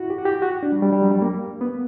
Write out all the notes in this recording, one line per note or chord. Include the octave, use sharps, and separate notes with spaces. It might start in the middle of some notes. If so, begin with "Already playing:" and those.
Already playing: E4 F#4
G4
F#4
G4
F#4
D4
G3
G3
G3
F#3
G3
A#3
B3